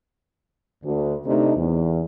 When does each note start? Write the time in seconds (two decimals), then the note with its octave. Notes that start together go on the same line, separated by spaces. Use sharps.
0.84 D2
1.26 C3 A3 D4 D#4
1.56 E2